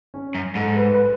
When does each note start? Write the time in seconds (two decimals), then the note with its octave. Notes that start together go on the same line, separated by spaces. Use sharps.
0.14 C#4
0.35 F#2
0.55 G#2 A4
0.76 B4
0.94 B4